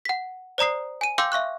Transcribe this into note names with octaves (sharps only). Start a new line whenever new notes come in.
F#5 B6
C5 D5 A#5 D#6 C7
G#5 D#7
F5 G5 C6 D6 E6 G6
E5 F5 C#6 F#6